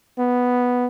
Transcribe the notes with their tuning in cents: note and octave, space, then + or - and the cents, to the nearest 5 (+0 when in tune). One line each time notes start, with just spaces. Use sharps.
B3 +0